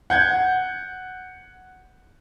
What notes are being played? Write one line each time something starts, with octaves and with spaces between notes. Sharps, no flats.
F#5 G6 G#6